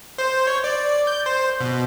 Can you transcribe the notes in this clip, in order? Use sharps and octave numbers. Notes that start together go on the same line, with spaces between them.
C5
C#5
D5
G6
C5
B2